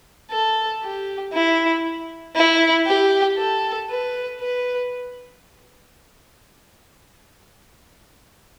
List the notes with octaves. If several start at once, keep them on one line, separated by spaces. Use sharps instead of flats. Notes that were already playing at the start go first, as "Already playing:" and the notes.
A4
G4
E4
E4
G4
A4
B4
B4